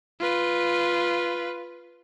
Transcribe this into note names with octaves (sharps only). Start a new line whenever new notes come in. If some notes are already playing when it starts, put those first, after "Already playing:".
F4 B4